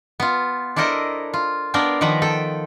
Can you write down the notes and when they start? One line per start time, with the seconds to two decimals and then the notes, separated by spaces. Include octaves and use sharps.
0.20 B3 F4
0.76 D4 E4 A4 A#4 C5 D#5
1.34 F4
1.74 B3 D4 A#4 F5 G5
2.01 D#3 F3 B3 B4 A#5
2.22 A4 G5